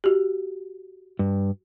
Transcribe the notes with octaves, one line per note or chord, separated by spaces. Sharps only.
F#4 G4
G2